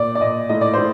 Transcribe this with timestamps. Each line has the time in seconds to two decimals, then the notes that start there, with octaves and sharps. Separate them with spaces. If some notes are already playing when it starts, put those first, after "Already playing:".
Already playing: A#2 D5
0.15 D5
0.21 A#2 D#5
0.49 A2 D#5
0.61 D5
0.74 A2 C5